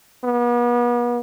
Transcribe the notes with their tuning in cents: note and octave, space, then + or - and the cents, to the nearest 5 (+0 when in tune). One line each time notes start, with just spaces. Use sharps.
B3 -40